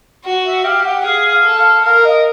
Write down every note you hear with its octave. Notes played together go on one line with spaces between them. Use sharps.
F#4
E5
G4 F5
F#5
G#4 F5
F5
A4
F5
A#4 F5
D#5